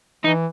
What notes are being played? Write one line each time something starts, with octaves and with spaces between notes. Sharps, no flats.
E3 D#4